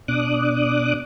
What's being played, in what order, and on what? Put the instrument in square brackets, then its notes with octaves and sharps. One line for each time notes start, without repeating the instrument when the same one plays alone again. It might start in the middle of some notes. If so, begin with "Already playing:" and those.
[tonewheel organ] B2 D4 D6 D#6 F#6